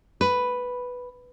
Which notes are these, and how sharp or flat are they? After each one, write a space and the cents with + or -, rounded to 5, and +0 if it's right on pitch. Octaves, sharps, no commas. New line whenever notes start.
B4 +0